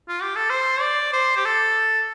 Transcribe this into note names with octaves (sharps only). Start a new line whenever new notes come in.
F4
G4
A4
C5
D5
C5
G4
A4